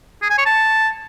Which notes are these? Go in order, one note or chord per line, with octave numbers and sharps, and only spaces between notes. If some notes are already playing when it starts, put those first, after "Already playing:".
G#4
G#5
C#5
A5